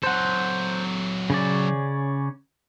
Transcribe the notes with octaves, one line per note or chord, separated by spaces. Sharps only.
F#3 A4 C5 F#5
C#3 C#4 D5